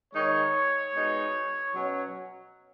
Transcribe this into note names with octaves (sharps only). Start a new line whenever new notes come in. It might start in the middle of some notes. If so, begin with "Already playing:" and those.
D#3 G#3 D#4 C#5
B2 G#3 D#4
B2 F#3 C#4